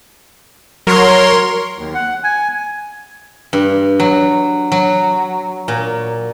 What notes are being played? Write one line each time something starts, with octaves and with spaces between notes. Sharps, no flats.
F#3 A#4 C#5 C6
D#2
F#5
G#5
G2
F#3
F#3
A#2